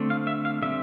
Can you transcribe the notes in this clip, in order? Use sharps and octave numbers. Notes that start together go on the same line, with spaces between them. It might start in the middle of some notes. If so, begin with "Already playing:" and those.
Already playing: D3 A3 C4
F5
E5
F5
D3 G3 C4 E5